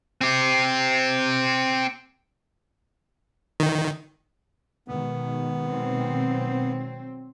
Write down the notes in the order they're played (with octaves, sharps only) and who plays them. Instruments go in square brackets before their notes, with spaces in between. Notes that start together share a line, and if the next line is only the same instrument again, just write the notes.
[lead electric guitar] C4 G4
[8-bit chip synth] D#3
[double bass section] B2 D#3 G#3 [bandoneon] B3
[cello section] F#3 C4